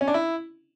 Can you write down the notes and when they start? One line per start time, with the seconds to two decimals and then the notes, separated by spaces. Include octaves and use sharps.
0.01 C#4
0.08 D4
0.14 E4